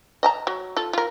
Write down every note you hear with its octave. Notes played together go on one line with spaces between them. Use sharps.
D#5 A5 A#5
F#3
F4 A4
F4 A#4